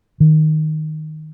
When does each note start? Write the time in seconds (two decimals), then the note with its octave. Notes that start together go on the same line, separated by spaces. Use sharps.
0.20 D#3